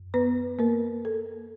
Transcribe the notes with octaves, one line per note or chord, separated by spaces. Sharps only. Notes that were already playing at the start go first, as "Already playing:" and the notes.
Already playing: F#2
B3 B4
A#3 A#4
A4